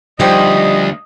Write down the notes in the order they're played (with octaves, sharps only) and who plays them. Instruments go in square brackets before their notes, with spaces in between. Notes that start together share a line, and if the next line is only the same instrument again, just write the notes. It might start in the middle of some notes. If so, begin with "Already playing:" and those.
[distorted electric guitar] D2 [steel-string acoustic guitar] F3 G3 [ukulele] D#4 G4 C5 [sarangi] D#5